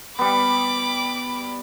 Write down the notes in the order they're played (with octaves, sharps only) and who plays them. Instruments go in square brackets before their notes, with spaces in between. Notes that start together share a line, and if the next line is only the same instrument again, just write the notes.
[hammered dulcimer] G3 B3 [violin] B5 D6